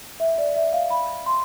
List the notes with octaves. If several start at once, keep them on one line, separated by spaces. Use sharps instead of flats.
E5
D5
E5
F5
B5
C6